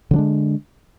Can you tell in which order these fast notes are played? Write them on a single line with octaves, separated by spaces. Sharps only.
D3 F#3 D4 G#3